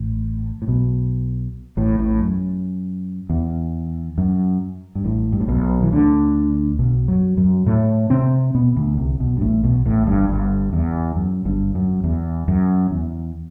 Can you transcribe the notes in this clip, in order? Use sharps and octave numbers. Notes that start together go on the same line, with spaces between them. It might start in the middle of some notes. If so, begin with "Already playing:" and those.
Already playing: A1 A2
A2
B1 B2
A1 A2
A1 A2
F#2
E2
F#2
G2
A1 A2
G2
A2
B1 B2
E3
D2 D3
B1 B2
F#2 F#3
F#2 F#3
A2 A3
C3 C4
B2 B3
D2 D3
C2 C3
B1 B2
G2
A1 A2
B1 B2
A1 A2
G1 G2
G1 G2
E2
F#2
G1 G2
F#2
E2
F#2
E2